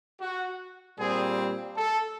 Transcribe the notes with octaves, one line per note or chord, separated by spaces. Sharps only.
F#4
A#2 G3 C4 G#4
A4